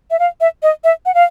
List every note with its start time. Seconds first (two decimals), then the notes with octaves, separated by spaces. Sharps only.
0.11 E5
0.19 F5
0.41 E5
0.63 D#5
0.84 E5
1.06 F#5
1.15 F5